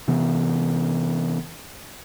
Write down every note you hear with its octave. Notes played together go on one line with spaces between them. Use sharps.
C3 E3 B3